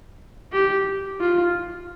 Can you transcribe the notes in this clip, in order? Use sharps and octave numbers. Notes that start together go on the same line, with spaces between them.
G4
F4